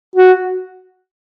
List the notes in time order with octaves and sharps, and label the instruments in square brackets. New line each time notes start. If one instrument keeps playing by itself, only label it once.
[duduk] F#4